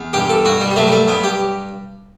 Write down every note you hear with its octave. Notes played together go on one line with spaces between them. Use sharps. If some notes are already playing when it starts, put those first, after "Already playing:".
Already playing: E2
G2 G4
A4
G2 F#4
G3
G3
F#3 A3
G3
A3
G2 B3
G4